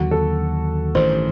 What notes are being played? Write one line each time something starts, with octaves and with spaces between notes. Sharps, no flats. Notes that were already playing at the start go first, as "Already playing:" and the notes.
Already playing: D#2 D3 F#3 F#4
A4
A1 G2 D#3 C5